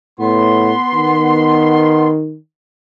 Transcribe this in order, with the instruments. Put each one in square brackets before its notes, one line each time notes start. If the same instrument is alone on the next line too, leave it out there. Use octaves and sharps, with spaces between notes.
[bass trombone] A2 [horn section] B3 C6
[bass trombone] D#3